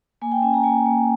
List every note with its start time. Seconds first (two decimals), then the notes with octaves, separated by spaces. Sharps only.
0.22 A#3 G#5
0.32 G5
0.42 C#4 G#5
0.54 A#5
0.63 A#3 G#5
0.86 A#3